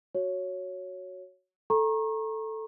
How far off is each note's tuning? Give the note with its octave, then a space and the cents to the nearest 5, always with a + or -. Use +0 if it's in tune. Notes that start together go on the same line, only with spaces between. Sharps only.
F#4 +0 C#5 +0
A4 +0 A#5 +10 C#6 -35